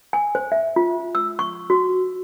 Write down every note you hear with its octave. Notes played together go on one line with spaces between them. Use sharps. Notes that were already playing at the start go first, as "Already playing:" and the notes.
G#5
C5
E5
F4
E6
C#6
F#4